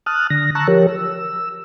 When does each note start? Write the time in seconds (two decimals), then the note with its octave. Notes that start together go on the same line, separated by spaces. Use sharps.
0.06 A5 D#6 F6 F#6
0.30 D3 A#6
0.55 A5 A#5 C#6 E6 F#6
0.68 F3 G4 A#4 C#5
0.89 E6